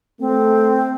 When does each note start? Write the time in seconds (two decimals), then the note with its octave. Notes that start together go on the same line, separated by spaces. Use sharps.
0.19 A3 C4